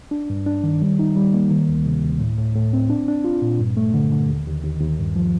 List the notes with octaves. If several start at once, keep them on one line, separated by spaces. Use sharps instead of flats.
D4
G2
D4
D#3
G3
D#4
G3
A#3
D#3
D2
C3
D2
A2
A2
A2
C4
D4
D4
F4
A#2
G2
A3
D3
D3
D#2
D#2
D#2
D#2
G2
F3